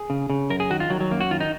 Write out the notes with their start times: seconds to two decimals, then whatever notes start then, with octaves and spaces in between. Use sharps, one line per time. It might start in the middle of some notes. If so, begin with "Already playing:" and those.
Already playing: G#4
0.10 C#3
0.30 C#3
0.50 F#2 A#4
0.60 G#4
0.70 D#3 F#4
0.80 F4
0.90 D#3 F#3
1.01 F#3
1.11 F#2 A#3
1.21 F#4
1.31 D#3 F4
1.40 D#4